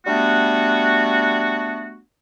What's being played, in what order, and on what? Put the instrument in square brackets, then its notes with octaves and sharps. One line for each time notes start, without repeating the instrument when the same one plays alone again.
[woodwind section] G3 A3 B3 D4 F#4